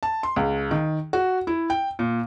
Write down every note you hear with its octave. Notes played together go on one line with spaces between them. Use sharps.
A5
C6
C#2
D#3
F#4
E4
G5
A#2